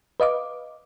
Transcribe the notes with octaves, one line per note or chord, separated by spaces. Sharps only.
B4 D#5 F5 D6